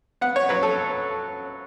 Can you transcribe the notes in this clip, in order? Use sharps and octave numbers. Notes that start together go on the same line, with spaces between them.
B3 F#5
C#5
F#3 B4
A4